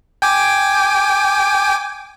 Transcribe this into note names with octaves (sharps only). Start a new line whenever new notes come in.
G5 G#5 D6